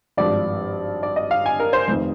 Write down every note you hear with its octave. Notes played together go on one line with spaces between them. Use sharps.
G#1 G2 F3 D5
D5
D#5
F5
G#5
A#4
C5
F1 F2 D#3